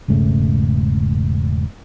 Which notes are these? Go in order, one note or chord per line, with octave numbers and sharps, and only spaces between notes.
E1 G#2 C#3 A3